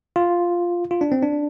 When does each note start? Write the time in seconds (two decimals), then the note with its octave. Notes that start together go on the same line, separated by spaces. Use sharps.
0.16 F4
0.91 F4
1.01 D4
1.12 C4
1.23 D4